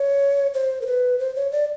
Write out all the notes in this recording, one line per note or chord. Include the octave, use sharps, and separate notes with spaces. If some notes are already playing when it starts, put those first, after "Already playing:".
Already playing: C#5
C5
A#4
B4
C5
C#5
D5